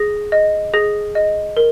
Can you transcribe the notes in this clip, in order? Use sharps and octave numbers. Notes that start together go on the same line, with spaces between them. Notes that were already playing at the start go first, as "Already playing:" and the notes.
Already playing: G#4 A#6
D#5
G#4 A#6
D#5
A#4